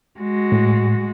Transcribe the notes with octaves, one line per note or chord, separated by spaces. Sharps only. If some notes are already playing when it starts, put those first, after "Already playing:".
G#3 F#4
A2